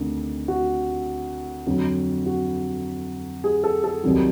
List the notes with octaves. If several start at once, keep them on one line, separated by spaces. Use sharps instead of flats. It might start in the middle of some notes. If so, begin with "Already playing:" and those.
Already playing: D2 C3 D#3 D4
F#4
F2 D3 F#3
F#4
G#4
A4
A4
C2 C3 D#3 F#3